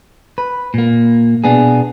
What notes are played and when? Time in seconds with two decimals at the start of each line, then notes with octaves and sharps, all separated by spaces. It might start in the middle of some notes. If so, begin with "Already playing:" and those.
0.38 B4
0.74 A#2 A#3
1.44 B2 B3 D4 G#4